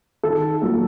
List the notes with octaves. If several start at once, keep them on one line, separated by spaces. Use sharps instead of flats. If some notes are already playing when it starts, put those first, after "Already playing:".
D#3 A4
F#3 A#3